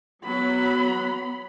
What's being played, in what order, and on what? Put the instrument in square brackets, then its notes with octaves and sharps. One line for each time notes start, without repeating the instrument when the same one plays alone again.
[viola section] F#3 F#5 [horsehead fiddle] B3 B5